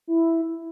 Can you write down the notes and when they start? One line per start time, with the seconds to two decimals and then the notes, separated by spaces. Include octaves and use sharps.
0.07 E4